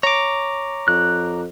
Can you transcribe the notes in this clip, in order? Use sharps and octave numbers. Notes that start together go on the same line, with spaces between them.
C#5 A#5 D6
F2 F#6